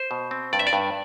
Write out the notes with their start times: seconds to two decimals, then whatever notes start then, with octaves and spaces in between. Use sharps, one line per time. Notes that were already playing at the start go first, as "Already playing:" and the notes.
Already playing: C5
0.11 B2
0.31 C4
0.53 G2 D5
0.59 E5
0.67 D5
0.73 G2